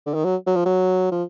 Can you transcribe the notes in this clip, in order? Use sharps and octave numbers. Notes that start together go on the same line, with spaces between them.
D3
D#3
F#3
F#3
F3
F#3
F3